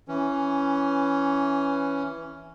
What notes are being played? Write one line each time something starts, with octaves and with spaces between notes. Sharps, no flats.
E3 C#4